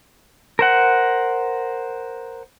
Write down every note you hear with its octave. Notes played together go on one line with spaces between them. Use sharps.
A#4 C5 F#5